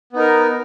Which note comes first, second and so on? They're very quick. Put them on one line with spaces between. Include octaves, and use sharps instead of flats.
B3 D#4 A#4